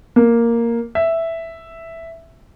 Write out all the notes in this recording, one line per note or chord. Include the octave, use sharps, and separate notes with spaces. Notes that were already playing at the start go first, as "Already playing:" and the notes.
A#3
E5